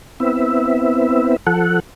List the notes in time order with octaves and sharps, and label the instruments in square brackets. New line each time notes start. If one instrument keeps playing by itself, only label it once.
[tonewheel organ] B3 C4 E4 E5
F3 A4 F#5